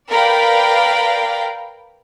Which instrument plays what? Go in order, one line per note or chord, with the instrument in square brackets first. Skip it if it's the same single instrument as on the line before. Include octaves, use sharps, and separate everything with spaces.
[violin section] A#4 B4 D5 F5 G5 B5